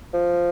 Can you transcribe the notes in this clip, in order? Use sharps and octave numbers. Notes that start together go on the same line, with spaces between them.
F3